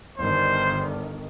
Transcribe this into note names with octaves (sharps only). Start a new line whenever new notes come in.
G1 D#3 C5